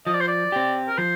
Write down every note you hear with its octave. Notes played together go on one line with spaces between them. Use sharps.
F3 D#5
D5
C5
D5
C4 G4
A#4
F3 C5